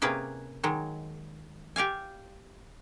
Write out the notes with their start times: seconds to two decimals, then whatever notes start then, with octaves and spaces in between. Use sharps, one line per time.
0.02 C3 A#3 C#4 G#4 B4 D5
0.63 D#3 F#3 G#3
1.76 G4 D5 F5 G#5